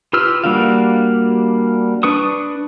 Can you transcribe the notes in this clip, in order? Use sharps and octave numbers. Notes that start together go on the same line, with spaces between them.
F4 G4 B4 E6 F6
G3 A#3 D4 F#4 F5
D4 B4 C#6 D#6